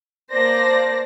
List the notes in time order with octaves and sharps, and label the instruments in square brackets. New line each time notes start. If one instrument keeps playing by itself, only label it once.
[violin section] A#3 C5 D5 A5 A#6